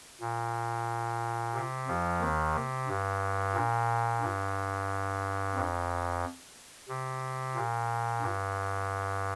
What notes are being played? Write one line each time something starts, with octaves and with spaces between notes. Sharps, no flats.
A#2
C3
F2 F3
D#2 D#3
C3
G2
A#2
G2
F2
C3
A#2
G2